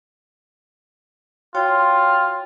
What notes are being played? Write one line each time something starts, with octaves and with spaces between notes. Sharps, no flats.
F4 F#4 C#5 G5